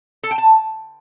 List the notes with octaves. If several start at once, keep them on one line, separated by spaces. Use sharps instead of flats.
A4
G5
A5